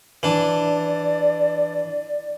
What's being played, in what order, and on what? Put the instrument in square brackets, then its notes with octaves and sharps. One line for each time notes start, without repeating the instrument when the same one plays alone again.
[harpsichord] E3 D4 [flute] D5